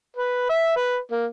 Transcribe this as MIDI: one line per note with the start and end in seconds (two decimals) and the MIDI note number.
0.17 0.45 71
0.50 0.72 76
0.77 0.98 71
1.11 1.26 58